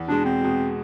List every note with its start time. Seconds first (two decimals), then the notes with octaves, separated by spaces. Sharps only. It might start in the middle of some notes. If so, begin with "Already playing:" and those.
Already playing: E2
0.08 B2 G#3 D4
0.25 E2 C4
0.41 B2 G#3